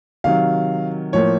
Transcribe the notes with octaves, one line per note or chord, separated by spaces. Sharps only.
C3 D#3 F#3 F5
A2 F3 A#3 C#5